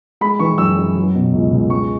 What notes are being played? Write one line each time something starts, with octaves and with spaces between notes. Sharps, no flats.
G#3 B5
E3 C#6
F#2 E6
F#2
F#3
B2
C#2
C#2
G#3 C#6